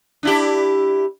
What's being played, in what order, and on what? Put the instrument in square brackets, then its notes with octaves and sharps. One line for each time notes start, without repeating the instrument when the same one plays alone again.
[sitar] D4 E4 G4